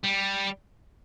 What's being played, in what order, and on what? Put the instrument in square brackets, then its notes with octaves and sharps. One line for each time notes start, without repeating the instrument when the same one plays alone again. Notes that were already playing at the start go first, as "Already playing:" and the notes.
[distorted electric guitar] G3